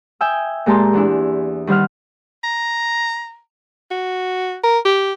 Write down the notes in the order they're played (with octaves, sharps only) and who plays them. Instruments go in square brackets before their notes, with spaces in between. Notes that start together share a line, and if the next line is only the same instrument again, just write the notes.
[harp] E5 G5 G#5 D#6 E6
A#2 G#3 G4 A5 A#5 C6
E2 D4 E4
D#3 G3 C5 F#5 F6
[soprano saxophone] A#5
F#4
A#4
G4